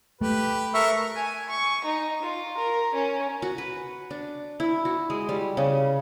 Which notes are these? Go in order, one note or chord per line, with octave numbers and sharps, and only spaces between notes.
A3 G4 B4
A4 A#4 E5 C#6
G#5
C#6
D#4
F4
A#4
C#4
F#4
B4
D4
E4
F#4
G#3
G3
C#3